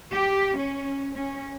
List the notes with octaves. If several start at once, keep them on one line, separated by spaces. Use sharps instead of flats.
G4
C#4
C#4